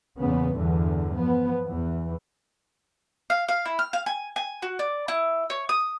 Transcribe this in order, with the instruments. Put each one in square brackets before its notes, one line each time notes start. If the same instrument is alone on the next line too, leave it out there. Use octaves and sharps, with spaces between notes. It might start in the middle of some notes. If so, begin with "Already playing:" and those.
[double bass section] E2 A#2 C#3 B3
E2 G2 D3 E3
F3 B3
E2 E3
[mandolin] F5
F5
E4
F6
F5
G#5
G#5
F#4
D5
E4
C#5
D#6